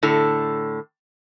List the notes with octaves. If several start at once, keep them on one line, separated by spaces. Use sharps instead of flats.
A2 D3 A4